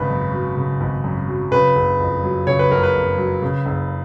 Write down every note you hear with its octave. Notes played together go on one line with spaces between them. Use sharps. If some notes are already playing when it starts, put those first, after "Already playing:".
Already playing: G#1 C#3 B4
F#2
F#3
C#3
G#1
F#2
F#3
C#3 B4
F#1
F2
F#3
C#3 C#5
B4
F#1 A#4
B4
F2
F#3
C#3
F#1